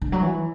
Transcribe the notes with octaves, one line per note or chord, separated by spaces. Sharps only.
D3
F#3
E3